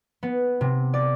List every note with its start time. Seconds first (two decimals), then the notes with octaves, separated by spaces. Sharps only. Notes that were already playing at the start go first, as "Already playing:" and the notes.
0.23 B3
0.61 C3
0.94 D5